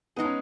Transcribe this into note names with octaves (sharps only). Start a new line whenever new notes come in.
G#3 B3 D#4 G#4
C#4